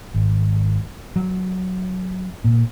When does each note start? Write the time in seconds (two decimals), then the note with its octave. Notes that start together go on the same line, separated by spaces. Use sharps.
0.14 G#1
1.16 F#3
2.44 A#2